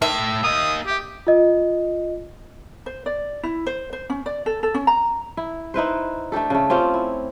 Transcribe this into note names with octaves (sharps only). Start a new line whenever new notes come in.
A2 E5
A#3 D#4 D#6
G4
F4 D#5
C5
D5
E4
C5
C5
C#4
D5
A4
A4
C#4
A#5
E4
D#4 E4 B4 C5
A3 D4 G4 A4
C#3 A3
C4 C#4 F4 G4
E4